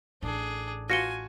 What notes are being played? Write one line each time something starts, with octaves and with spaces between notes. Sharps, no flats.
A1 D4 G#4
F4 F#4 G#5 A#6 C#7 G7